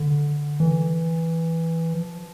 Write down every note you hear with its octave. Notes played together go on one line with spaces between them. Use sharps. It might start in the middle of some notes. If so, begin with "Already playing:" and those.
Already playing: D3
E3
F3